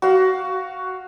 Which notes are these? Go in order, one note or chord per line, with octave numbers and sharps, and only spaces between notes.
F#4 F5